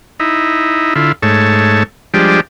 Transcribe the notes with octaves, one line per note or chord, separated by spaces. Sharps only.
D#4 E4
D3 E4 F4
G#2 A3 C#5 A5
F3 G3 G#3 D4 G4